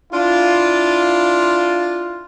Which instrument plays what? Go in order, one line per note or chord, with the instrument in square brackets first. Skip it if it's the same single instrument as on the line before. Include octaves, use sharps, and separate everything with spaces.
[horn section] D4 E4 F4